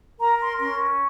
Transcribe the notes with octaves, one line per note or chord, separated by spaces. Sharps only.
A#4 A#5
C6
C#4 C6